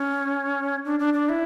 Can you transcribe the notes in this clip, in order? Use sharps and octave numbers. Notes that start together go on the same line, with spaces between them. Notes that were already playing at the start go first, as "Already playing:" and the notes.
Already playing: C#4
D4
D4
D4
E4